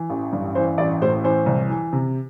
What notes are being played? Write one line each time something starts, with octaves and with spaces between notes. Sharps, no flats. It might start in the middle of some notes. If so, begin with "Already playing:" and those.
Already playing: E3
A1
G2
E3 C5
A1 D5
A2 C5
E3 C5
C2
E3
C3